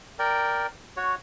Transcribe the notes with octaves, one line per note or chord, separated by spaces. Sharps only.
A#4 D5 G5
F#4 C#5